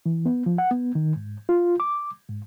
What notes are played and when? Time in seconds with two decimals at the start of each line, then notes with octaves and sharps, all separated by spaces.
0.06 E3
0.26 B3
0.46 F3
0.58 F#5
0.71 B3
0.95 D#3
1.16 G#2
1.49 F4
1.80 D6
2.29 G#2